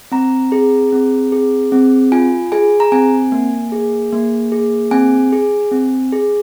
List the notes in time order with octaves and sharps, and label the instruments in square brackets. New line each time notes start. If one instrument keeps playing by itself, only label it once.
[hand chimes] C4 A#5
G#4
C4
G#4
C4
F4 G#5
G#4 G#5
A#5
C4 G#5
A#3
G#4
A#3
G#4
C4 G#5
G#4
C4
G#4